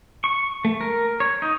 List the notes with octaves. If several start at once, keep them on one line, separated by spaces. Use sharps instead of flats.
C#6
A3
A#4
C#5
D#4